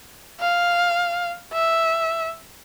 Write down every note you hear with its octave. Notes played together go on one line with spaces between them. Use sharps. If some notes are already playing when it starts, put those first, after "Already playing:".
F5
E5